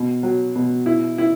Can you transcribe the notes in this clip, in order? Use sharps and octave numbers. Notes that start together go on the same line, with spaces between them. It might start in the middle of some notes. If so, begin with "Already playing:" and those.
Already playing: B2
F#3
B2
E4
E4